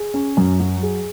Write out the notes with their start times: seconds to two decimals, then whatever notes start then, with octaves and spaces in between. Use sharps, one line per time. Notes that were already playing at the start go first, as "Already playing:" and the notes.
Already playing: G#4
0.14 C#4
0.37 F#2
0.60 F#3
0.83 G#4